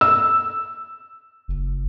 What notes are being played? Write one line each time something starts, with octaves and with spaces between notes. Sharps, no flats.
E6
F#1